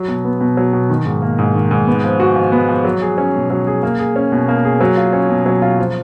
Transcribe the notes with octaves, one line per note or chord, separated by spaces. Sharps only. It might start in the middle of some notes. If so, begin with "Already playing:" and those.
Already playing: F#3
B2
B3
B2
F#3
B2
D#3
G#2
A#3
G#2
D#3
G#2
B3
F3
F#4
F3
B3
F3
F#3
G#4
C#4
B2
F#3
G#4
A#3
G#4
C#4
B2
A#3
G#4
F#3
F4
C#4
B2
F#3
F4
F3